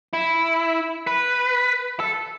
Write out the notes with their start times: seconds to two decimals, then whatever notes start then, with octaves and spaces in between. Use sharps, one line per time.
0.13 E4
1.07 B4
2.00 A4